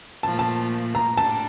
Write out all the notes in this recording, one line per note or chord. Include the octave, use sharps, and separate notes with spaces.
A#2 F3 A3 A5
A5
A#5
A2 G3 D4 A5